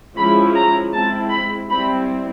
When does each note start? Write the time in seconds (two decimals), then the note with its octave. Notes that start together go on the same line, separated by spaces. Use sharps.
0.17 F3 G#3 C#4 E4 B5
0.55 A#5
0.93 G#3 C4 E4 A5
1.31 B5
1.70 G3 C4 E4 B5